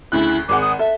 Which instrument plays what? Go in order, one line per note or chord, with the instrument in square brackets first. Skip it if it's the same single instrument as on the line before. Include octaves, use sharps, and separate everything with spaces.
[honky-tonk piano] D2 C#3 F#6 [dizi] E4
[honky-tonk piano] G#1 G#4 F#5 [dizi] D6
[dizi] D#6
[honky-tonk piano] A4 [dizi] E5